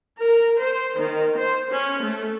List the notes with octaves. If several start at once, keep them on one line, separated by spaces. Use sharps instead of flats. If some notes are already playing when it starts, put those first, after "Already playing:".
A#4
C5
D#3
C5
C#4
A3